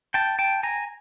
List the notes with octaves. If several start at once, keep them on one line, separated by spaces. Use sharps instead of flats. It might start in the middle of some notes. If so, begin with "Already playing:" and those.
G5 A5
G5 A5
G#5 A#5